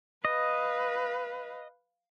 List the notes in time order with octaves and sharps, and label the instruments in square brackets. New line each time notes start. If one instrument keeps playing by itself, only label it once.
[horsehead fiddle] B4 F5 [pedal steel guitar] D#5